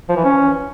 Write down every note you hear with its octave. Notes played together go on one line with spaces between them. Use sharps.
F3
E3
C#4